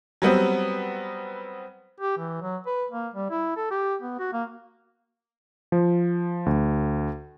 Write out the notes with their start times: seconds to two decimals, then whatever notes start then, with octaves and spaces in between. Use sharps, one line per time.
0.22 F#3 G3 B3 C4
2.00 G4
2.18 E3
2.41 F#3
2.66 B4
2.91 A#3
3.14 G3
3.31 E4
3.56 A4
3.71 G4
4.02 B3
4.19 F#4
4.33 A#3
5.72 F3
6.46 D2